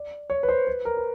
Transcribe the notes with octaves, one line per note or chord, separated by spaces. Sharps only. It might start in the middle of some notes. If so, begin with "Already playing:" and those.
Already playing: D5
C#5
B4
C5
B4
A#4
B4